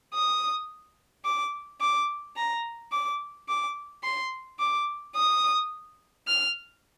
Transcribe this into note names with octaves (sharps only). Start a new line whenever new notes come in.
D#6
D6
D6
A#5
D6
D6
C6
D6
D#6
F6